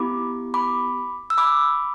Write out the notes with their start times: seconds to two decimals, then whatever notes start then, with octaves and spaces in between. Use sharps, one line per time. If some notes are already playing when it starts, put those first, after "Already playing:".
Already playing: B3 E4 G4 B5 D6
0.54 B5 D6
1.30 E6
1.38 B5 D6